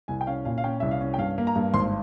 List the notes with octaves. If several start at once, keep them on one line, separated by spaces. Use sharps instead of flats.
C2 G#5
G5
C#4 F5
A#2 F5
F5
C#4 G5
C2 E5
F5
C#4
G5
G2 F5
A#3
A#5
G2
G#1 C6